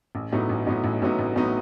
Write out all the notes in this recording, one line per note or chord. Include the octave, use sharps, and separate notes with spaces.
A1
A2 F#3 B3 D#4
A1
A2 F#3 B3 D#4
A1
A2 F#3 B3 D#4
A1
A2 F#3 B3 D#4